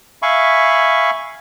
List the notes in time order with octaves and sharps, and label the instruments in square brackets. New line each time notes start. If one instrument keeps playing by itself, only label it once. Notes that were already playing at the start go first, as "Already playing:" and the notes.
[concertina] E5 F5 G#5 B5 C#6